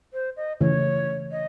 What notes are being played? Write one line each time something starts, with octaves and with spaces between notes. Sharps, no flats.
C5
D#5
C#3 E3 A3 C#5
D#5